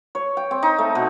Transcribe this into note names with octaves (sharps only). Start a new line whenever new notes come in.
C#5
G5
C4
D#4
A3
B2